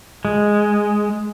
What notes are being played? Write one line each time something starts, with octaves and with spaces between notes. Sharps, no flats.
G#3